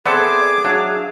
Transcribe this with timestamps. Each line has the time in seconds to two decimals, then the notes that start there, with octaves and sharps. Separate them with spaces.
0.06 B3 C4 G#4 A4 D5 E5 C6 D6
0.64 F#3 D4 E5 F5